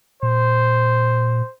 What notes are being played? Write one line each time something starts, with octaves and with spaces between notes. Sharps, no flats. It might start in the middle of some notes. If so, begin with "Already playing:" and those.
A#2 C5